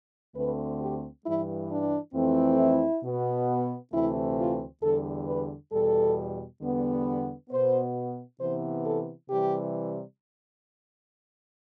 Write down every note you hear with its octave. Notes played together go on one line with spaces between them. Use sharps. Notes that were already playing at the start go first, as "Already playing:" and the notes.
D2 D3 A3 C4 B4
G4
G2 E3 G3 E4
D4
F2 E3 A3 C4
E4
B2 B3
D2 C3 E3 A3 C4 E4
F4
E2 D3 G3 A4
B4
E2 B2 G3 A4
E2 D3 G3 B3
B4
B2 B3 C5
C3 E3 B3 C5
A4
C3 E3 G3 G4